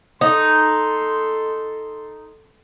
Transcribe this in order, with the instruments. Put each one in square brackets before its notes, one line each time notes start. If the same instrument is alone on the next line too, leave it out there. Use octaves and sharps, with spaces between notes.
[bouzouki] D#4 [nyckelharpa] A4 C6